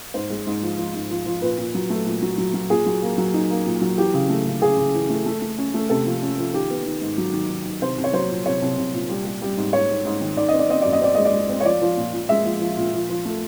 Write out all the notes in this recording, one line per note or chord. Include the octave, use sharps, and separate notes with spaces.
G#2 C5
G#3
G#2
F3
F3
G#2
F3
F3
A#2 B4
A#2
F#3
A3
A#2
F#3
F#3
F#3
A#2 G#4
F#3
A#3
F#3
D#4
A#3
A#2
F#3
E3 G4
C#3
A3
C#3
C#3 G#4
C#3
E3
A3
A3
A3
C#4
A3
C3 A4
F3
C#4
F3
D#3 G4
B3
D#3
G#2
F#3
D#3
D#3
D#3
C2 C5
C2
C#5
F#3 C5
A#2
C2 C#5
C2
C2
A#2
G3
G3
G3
G#2
G#2 C#5
G#2
G#2
D#3
D#3 D5
C4 D#5
D5
C4 D#5
F#2 D5
D#5
C4 D5
G#3 D#5
D5
G#3
C4
C#5
F3 D5
F3
A#2
A#2
G#3 E5
F3
F3
A#2
F3
F3
A3